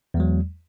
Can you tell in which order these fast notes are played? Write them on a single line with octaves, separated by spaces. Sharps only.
E2 G#3 F#3